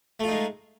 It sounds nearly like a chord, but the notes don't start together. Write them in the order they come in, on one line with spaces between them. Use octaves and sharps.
A3 F4 D#4 G#3